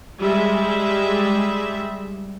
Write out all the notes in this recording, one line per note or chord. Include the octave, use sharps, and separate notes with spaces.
G3 G#3 E5